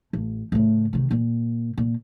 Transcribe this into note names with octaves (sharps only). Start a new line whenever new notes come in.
A1
A2 C#3
C3 D#3
A#2
A#2